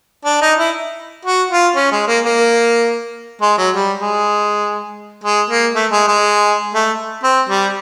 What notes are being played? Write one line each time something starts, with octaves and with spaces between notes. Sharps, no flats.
D4
D#4
E4
F#4
F4
C#4
G#3
A#3
A#3
G#3
F#3
G3
G#3
G#3
A#3
A3
G#3
G#3
A3
C4
G3